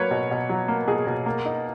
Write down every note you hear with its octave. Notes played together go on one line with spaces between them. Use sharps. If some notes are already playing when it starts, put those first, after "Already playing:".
Already playing: F#3 A#3 B4 C#5
B2
B2
F#3
A#3
B2 G#4
B2
A#3
D#4